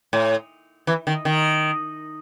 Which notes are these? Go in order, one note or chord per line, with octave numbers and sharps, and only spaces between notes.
A2
E3
D#3
D#3